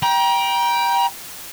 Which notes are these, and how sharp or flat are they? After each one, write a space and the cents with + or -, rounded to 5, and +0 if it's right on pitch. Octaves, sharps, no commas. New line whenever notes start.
G5 +0 A#5 +35